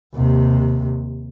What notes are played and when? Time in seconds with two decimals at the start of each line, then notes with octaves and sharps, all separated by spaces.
0.15 D#2 C3